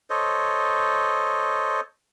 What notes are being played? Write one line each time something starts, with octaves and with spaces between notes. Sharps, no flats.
A4 C5 C#5 D#5